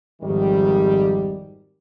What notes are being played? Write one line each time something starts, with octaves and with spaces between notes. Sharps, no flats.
G#1 F2 D#3 G3